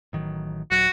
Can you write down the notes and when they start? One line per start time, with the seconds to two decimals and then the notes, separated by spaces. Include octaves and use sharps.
0.13 A1 D#3 F#3
0.71 D#1 F#3 F#4